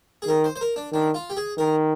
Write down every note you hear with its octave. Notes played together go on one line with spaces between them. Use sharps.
G#4
D#3 A#4
C5
C5
A#4
D4
D#3 D4
F4
G4
G#4
D#3 A#4